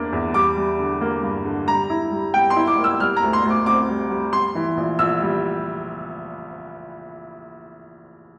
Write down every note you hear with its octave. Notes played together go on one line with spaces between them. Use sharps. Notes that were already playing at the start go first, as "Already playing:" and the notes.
Already playing: E2 A#3 D4
E2
G3 D6
G3
D3
A#3
G2
D3
G3 A#5
E4
G3
G3 G5
C6
E4
D6
A#3
E6
G3 F6
A#5
D2
C6
D2
D6
C4 D6
G3
G3
G3 C6
E3
A#1
A#1 E6
G3